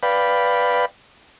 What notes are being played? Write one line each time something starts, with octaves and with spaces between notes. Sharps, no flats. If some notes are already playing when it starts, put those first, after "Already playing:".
B4 D5 F5 G5 B5